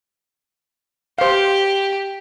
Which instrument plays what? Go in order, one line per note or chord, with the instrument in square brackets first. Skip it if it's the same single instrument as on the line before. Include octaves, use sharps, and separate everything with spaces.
[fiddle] G4 [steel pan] C5 F5